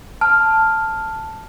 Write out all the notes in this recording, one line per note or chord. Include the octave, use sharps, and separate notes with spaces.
A5 F6